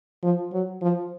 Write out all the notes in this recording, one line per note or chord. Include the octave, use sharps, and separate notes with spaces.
F3
F#3
F3